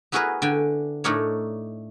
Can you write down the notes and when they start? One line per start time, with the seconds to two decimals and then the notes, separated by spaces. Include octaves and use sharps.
0.12 B3 E4 F#4 G#4 A#4 B4
0.42 D3 G5 G#5
1.04 A2 A3 D4 D#4 A#4 C#5